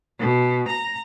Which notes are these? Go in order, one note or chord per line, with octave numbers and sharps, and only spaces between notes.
B2
A#5